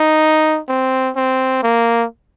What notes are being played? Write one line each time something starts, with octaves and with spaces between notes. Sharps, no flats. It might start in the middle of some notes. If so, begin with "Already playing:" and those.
Already playing: D#4
C4
C4
A#3